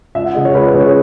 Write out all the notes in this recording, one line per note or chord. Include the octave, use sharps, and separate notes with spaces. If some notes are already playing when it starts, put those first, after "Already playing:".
C#2 E5
F#5
C#3 G#3 D#5
C#5
C#2 B4
C#5
C#3 G#3
C#5